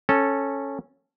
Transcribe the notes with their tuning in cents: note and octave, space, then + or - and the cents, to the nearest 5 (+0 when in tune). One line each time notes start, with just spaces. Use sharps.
C#4 -10 A4 +0